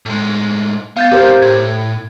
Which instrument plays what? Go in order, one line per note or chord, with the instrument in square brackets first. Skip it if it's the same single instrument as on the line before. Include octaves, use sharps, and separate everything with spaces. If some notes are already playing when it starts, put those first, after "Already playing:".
[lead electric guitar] A2 G#3
[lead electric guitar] B3 [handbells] F5 G6 A6
[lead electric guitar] B1 C4 [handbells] G4 A#4 C5
[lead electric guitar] A2 [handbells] G#6